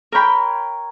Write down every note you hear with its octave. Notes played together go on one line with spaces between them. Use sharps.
A#4 C#5 G5 B5